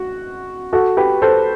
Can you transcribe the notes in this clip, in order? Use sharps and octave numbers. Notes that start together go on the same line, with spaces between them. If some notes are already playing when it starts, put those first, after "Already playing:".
Already playing: F#4
F#4 A4
G4 B4
A4 C5